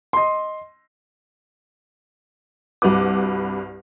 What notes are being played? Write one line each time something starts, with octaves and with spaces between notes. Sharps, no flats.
D#5 C6
C2 G2 F#4 B4 D6